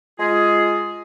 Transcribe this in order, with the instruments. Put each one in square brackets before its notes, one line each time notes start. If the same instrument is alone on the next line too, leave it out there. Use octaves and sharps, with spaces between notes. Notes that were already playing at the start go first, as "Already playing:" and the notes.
[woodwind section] G#3 F4 G#4